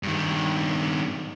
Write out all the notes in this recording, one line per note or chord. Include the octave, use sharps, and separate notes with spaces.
G2 D#3